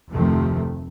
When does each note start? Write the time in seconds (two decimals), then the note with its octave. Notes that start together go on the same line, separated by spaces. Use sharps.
0.11 F1 D2 C3 D#3 F3 A3